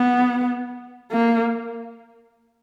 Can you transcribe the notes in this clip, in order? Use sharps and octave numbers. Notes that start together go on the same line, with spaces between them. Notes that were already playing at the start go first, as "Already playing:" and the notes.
Already playing: B3
A#3